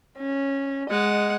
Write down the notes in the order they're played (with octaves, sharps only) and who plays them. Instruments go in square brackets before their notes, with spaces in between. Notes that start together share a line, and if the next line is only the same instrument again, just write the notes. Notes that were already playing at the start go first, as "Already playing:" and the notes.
[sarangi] C#4
[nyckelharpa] G#3 F#5 [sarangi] D#5